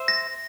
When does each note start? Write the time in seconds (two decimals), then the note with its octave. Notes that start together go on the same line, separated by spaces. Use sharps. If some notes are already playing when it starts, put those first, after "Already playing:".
Already playing: C5 E5
0.08 A#6